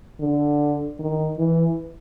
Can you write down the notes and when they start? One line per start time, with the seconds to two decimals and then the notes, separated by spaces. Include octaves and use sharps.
0.20 D3
0.99 D#3
1.38 E3